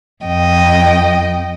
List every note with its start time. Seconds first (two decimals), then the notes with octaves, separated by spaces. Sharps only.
0.24 F2 D#5 G5